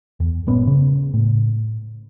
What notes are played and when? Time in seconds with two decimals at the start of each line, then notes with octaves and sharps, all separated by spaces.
0.20 E2
0.47 G1 A#2 B3 C#4
0.67 C#3
1.14 A2